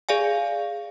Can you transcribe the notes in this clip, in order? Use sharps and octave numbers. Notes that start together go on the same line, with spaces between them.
G#4 D5 F5 G#5